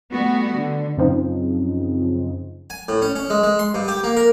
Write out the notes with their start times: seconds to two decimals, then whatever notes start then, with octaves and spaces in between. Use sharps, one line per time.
0.12 G3 A3 B3 F#4
0.55 D3
0.97 F#2 C#3 F3 C4 D#4
2.70 G#5
2.88 A2
3.02 C#4
3.16 C#4
3.30 G#3
3.43 G#3
3.59 C6
3.74 G2
3.88 G4
4.04 A#3
4.17 A#4